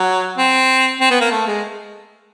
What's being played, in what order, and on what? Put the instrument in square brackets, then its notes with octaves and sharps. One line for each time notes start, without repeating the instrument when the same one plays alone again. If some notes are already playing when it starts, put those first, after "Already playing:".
Already playing: [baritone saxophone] F#3
C4
C4
B3
A#3
A3
G#3